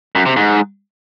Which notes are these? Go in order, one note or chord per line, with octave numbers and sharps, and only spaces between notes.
F#2
C3
G#2